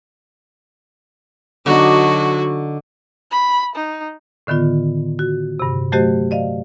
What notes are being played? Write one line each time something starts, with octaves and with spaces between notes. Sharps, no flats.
D3 F#3 D4 D#4 F#4
B5
D#4
A2 D3 D#3 B3 F4
F#4
G2 C3
F#3 A3 F#4 G4 C5 D#5
D5 D#5 F5